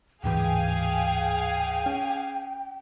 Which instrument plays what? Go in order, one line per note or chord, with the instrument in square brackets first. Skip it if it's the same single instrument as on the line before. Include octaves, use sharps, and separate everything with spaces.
[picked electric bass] D1 G#2 E3 [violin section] G#4 F5 G#5 [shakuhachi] G5
[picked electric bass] C#4